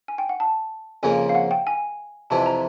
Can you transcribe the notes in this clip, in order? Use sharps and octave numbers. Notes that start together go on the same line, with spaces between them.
G#5
G5
F#5
A5
F2 C#3 F3 A#3 G#5
F5
F#5
G5
G#5
F2 C3 E3 A5
A#5